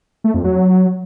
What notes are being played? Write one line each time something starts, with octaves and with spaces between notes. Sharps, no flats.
A3
F2
F#3